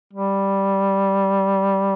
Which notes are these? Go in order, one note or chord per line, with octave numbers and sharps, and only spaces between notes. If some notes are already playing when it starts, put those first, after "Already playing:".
G3